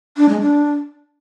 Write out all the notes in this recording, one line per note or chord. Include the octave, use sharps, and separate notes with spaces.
D4
G#3
D4